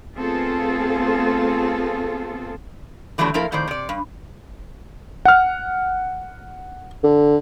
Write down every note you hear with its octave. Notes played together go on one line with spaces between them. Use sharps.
A3 B3 C4 F4 G#4 A4
D3 E3 F#3 G3 A3 D4
F3 A#3 E4 A4 A#4
F2 A2 D#3 C5 D5
C3 D5
G2
F#5 F6
D3